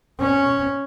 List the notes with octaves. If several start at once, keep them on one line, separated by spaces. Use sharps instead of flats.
C#4